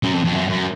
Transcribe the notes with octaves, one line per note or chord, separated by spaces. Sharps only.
F#2
F2
F2
F#2
F#2